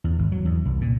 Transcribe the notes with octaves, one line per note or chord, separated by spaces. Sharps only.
E2
G#1
F#3
E2
C2
A#2